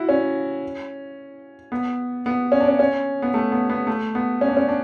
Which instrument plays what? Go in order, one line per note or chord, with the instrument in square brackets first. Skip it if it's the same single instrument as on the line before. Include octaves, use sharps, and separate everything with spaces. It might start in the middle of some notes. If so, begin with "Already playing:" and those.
Already playing: [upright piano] E4 F#4
C#4
B3
B3
C#4
D4
C#4
C#4
B3
A3
B3
B3
A3
B3
C#4
D4
C#4
D4